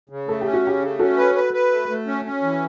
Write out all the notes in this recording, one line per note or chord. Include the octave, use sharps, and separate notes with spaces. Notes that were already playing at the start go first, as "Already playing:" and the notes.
C#3
A3 A4
C#4 G4
F#4
C#3 G4
A3
C#4 F#4 A4
B4
B4
B4
A3
A3
C#4
C#4
E3